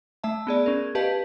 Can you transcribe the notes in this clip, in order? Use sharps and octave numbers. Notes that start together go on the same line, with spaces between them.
A3 E5 A5
B3 G#4 D5
C#4 A#4
G4 B4 D#5 F5 A5